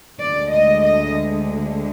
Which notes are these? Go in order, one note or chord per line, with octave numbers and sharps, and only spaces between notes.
D2 D3 G#3 D5
D#5
D#5